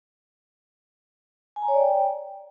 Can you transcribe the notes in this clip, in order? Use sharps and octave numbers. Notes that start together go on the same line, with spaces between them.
G#5
A#5
C#5
D5
G5